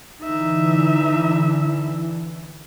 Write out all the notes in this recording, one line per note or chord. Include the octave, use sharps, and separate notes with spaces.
D3 E3 D#4 E5